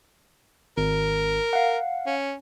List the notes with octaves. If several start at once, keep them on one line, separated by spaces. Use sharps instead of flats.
G#1 A#4
F5 F#5
C#4